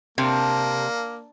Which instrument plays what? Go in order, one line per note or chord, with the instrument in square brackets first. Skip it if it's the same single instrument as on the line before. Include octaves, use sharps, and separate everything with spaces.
[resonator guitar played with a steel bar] C3 [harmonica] A#3 [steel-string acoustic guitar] D4